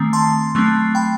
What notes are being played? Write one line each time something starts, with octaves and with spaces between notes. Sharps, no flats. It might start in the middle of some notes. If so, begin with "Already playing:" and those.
Already playing: D#3 A3 C4
A5 C6
F#3 A3 C4
G5 B5